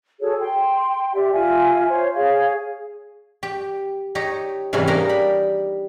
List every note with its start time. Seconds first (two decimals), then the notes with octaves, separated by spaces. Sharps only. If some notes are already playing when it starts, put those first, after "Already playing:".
0.21 F#4 G#4 A4 C#5
0.40 G5 C6
1.14 G4 D5 E5
1.32 F4 E5 G#5
1.88 C5 C#5
2.14 G#4 C#5 F5
3.43 G4
4.15 D#4 G4 C#5
4.73 G#2 C3 E3 G3 C#4 E4
4.87 A#3 D4 D#4 G4 A#4
5.09 B5